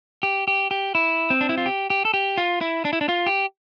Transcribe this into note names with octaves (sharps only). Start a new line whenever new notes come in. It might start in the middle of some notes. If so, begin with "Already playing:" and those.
G4
G4
G4
E4
C4
D4
E4
F4
G4
G4
A4
G4
F4
E4
D4
E4
D4
F4
G4